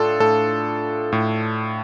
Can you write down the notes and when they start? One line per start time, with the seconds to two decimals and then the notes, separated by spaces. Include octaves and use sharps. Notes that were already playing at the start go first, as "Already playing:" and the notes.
Already playing: A2 D4 F4 A4
0.20 A2 A4
1.12 A2